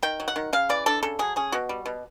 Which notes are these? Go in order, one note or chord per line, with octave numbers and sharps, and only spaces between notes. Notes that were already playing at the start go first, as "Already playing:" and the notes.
D#3 G5
F#3
F#5
D#3
C#3 F5
E3 D5
D4 A4
C#3 A4
F#3 G#4
C#4 G#4
B2 F#4
G3
B2